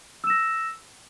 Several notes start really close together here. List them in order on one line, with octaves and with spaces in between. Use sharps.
E6 E7 A#6